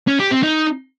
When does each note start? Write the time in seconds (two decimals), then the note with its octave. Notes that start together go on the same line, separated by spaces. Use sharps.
0.08 C#4
0.19 G4
0.31 C4
0.43 D#4